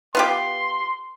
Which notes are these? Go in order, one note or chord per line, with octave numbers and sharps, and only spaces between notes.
B3 F4 G4 C6